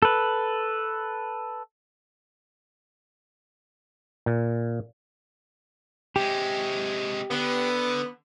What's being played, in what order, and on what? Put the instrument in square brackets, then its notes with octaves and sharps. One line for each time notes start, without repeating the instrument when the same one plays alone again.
[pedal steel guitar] A4 B4
[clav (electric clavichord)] A#2
[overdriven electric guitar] C3 G#3 [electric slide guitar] G4
[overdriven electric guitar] D3 [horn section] B3